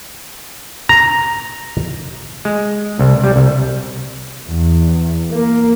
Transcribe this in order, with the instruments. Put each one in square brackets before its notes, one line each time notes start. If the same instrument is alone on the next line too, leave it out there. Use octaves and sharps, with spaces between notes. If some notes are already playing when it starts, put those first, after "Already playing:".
[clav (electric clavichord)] A#5
G#3
C2
G3
C2
[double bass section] E2
A#3